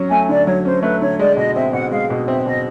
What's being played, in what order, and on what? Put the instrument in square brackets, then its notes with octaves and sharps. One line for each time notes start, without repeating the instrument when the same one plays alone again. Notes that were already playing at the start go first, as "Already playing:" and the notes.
Already playing: [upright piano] F#3 C#4
[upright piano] A3 [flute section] G#5
[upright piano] D3 [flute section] D5
[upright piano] F#3 [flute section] C#5
[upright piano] C#4 [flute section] C5
[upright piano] A3 [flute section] B4
[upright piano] D3 [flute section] C#5
[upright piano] G#3 [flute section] D5
[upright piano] B2 [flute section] D#5
[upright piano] C4 [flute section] E5
[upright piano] B2 [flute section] F#5
[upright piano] G#3 [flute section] F5
[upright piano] B2
[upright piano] C4 [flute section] E5
[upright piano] B2 [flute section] D#5